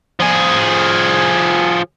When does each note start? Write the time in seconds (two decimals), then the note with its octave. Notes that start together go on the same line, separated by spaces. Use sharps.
0.20 F3 G#4